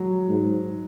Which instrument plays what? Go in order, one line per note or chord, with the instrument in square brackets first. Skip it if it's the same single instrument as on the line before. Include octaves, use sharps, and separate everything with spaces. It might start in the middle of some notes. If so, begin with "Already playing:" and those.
Already playing: [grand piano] F#3 G#3
[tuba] G#2